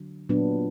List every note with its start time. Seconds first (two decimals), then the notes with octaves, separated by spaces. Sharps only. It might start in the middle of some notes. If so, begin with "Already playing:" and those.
Already playing: D3 F#3
0.29 A#2 F#3 B3 D4